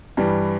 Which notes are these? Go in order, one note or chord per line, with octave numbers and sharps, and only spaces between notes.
G2 E3 G3